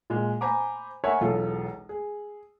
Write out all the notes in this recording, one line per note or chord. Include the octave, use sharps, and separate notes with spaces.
A#2 G#3
C5 G#5 A#5 B5 D6
A#4 C#5 E5 F#5 G#5
E1 B1 F4 A4
G#4